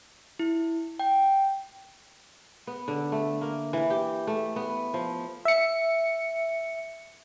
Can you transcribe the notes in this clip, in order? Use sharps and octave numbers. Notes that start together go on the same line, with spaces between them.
E4
G5
B3
D3
A3
A#3
E3
G4
A3
B3
F3
E5 C#7